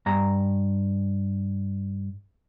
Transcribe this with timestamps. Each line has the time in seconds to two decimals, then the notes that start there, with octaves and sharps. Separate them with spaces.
0.06 G2 A#5